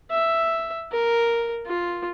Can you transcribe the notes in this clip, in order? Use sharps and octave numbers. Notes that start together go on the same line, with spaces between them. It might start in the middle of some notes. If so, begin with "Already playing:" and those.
E5
A#4
F4